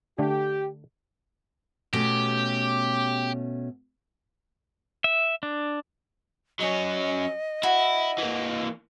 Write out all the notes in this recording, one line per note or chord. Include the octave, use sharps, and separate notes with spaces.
D3 A3 D4 G4
B2 A3 C#4 G4
E5
D4
F#3 C#4 D#5
E4 F#4
E3 A#3